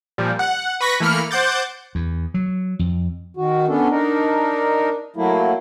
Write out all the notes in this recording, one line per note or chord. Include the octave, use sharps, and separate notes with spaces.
A#2 F3 G3
F#5
B4 B5 C#6 A#6 B6
E3 A3 A#3 B5 F6 C#7
C5 F#5 D6 G6 A6
E2
F#3
F2
D#3 F#4
B3 C#4 D4 A4
D4 D#4 A#4
F#3 A3 A#3 E4